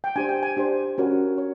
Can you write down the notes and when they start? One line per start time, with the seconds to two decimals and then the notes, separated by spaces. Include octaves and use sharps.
0.04 G5
0.16 D4 G4 C5 G#5
0.29 G5
0.43 G#5
0.57 D4 G4 C5
0.98 C#4 F#4 A#4 C#5
1.38 C#5